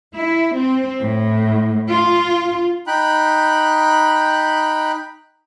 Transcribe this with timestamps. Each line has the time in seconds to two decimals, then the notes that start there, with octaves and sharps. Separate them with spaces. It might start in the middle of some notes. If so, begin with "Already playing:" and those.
0.15 E4
0.54 C4
1.02 A2
1.89 F4
2.87 D#4 G5 B5 F#6